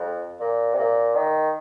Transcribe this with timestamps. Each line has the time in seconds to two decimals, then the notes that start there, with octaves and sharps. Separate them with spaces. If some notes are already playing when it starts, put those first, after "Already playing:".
Already playing: F2
0.40 A#2
0.74 C3
0.79 A#2
1.16 D#3